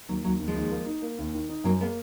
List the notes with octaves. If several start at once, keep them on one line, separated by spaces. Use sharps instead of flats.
D#2 F#3
D#2 F#3
D#2
F3 G#3
D#2
A#3
D#4
A#3
D#2
D#3
D#4
F#2 F#3 A#3
G#3 A#3 B3